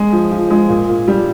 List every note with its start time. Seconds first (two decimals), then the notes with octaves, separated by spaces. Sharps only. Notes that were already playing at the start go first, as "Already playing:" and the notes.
Already playing: G#3
0.13 F3
0.31 F3
0.50 G#3
0.69 A#2
0.89 A#2
1.07 G3